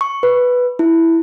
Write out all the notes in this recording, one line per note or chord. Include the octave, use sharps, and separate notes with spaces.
C#6
B4
E4